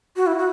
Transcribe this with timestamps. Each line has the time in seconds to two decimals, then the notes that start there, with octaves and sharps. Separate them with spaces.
0.16 F#4
0.27 E4
0.38 F#4